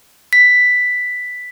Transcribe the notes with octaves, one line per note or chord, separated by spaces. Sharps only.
B6